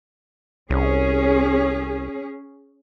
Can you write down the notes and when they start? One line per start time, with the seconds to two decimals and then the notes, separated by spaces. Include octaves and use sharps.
0.70 C2 C#4 G#4